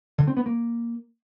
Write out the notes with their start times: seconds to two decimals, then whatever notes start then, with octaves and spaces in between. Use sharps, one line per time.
0.18 D3
0.27 C4
0.37 B3
0.46 A#3